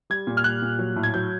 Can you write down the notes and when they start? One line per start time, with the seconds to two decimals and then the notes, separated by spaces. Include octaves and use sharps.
0.10 G3 G#6
0.27 A#2
0.37 F6
0.44 G3 F#6
0.62 A#2
0.79 F#3
0.96 A2
1.03 G#6
1.14 F#3 G6